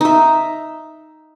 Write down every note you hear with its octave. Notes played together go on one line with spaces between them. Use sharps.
D#4 E5